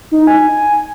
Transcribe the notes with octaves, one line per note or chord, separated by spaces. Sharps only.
D#4
G#5